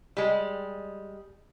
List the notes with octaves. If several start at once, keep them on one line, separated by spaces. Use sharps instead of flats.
G3 G#3